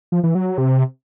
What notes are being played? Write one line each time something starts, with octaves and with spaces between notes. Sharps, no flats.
F3
E3
F#3
F#3
C3